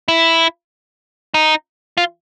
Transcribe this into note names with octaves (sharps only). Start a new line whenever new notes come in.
E4
D#4
F4